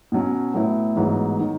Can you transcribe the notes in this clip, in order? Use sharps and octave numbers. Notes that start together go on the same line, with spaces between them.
B2 F#3 C#4
A2 F#3 B3 E4
A1 G#2 F#3 B3
D#3